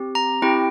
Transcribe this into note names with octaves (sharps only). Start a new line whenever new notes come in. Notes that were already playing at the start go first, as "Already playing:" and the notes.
Already playing: C4 G4
A#5
C4 E4 G4 G5